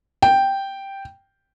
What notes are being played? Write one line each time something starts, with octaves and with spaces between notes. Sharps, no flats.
G5